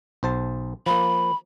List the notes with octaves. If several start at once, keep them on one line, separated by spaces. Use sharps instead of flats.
B1 C5 A5
F3 A#3 B5